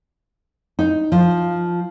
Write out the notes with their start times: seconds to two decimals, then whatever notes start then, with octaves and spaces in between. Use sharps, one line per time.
0.79 D#4
1.12 F3